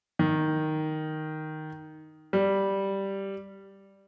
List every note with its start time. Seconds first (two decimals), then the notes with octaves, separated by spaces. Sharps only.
0.19 D#3
2.33 G3